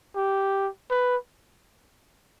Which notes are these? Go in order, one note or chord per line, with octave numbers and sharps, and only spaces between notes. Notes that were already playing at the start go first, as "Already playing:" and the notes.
G4
B4